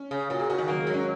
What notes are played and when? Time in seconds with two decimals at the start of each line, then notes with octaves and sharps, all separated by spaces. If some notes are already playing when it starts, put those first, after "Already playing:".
Already playing: C#4
0.11 C#3
0.30 A#2 F#4
0.40 G#4
0.50 C#3 F#4
0.58 D#3
0.68 F#3 A#3
0.80 G#3
0.87 F#3
0.94 C#4